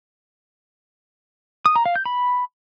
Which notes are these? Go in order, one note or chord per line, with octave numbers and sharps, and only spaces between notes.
D#6
A#5
F5
G6
B5